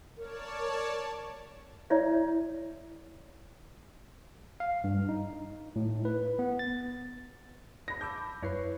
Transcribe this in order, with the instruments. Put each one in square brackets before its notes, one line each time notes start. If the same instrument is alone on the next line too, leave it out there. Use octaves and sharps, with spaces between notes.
[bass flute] A#4 [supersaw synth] C#5 D5 A5
[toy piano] E4 C#5 D5 E5
[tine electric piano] F5
G2
D#4
A2
B4
B3
A6
[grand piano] B5 A#6
[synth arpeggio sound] A5 D6 E6 [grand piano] G6
[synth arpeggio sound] F#2 E4 C7 [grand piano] B4 C#5